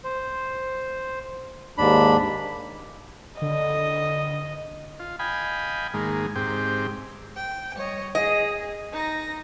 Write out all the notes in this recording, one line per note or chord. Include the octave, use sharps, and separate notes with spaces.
C5
D#2 G#2 D4 B5
D3 D#5
F4
D#5 F5 G5 G#5 B5
G#2 D#3 G#3 A#3
G#2 C4 G4
G5
G3 C#5 D#5
G#4 D#5
D#4 A#6